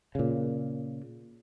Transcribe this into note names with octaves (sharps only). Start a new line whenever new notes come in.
A#2 C#3